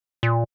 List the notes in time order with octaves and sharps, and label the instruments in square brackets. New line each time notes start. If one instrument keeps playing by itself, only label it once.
[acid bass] A#2